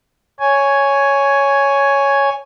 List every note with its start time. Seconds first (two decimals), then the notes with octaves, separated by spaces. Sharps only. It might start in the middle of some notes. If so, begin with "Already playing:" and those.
0.40 C#5 G#5